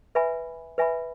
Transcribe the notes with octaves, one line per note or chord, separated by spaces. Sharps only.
B4 E5 G#5 B5
B4 E5 G#5 B5